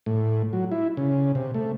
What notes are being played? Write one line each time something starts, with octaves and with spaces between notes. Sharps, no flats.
A2
F#3
E4
C#3
C3
A3